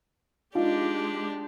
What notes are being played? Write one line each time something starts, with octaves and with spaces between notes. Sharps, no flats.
G#3 D4 D#4 F4 G4